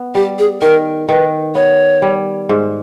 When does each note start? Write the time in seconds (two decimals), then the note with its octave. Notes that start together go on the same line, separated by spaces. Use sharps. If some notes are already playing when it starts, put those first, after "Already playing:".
Already playing: B3
0.15 G3 G4
0.39 G#4
0.61 D#3 A#4
1.09 D#3 B4
1.55 B3 C#5
2.02 G3
2.49 G#2